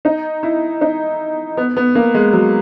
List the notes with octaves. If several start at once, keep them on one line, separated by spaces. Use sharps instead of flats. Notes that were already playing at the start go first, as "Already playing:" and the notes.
D#4
E4
D#4
B3
B3
A#3
G#3
F#3